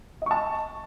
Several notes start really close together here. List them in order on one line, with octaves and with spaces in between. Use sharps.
D#5 C#6 A5